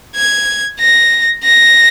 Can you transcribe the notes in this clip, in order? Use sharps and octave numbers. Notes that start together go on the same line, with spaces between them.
G#6
A#6
A#6